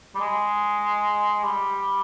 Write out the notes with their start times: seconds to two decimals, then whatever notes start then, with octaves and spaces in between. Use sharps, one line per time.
0.15 G3
0.20 G#3
1.44 G3